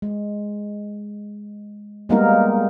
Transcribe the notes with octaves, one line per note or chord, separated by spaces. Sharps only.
G#3
G3 G#3 A#3 B3 D#4 A#4